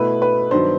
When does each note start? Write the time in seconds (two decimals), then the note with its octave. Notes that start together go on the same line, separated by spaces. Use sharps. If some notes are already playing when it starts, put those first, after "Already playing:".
Already playing: B2 A3 E4 B4
0.22 B4
0.51 G2 D#3 F#3 B3 C5